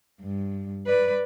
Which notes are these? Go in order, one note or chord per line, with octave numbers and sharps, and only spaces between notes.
G2
B4 D5